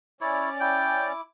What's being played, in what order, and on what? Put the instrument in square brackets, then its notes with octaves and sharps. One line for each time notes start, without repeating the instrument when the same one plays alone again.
[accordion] C#4 D5 [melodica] E4 C#5
[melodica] E4 D6 [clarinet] G5